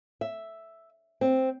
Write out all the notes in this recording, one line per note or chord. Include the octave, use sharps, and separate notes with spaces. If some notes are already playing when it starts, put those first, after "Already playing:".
E5
C4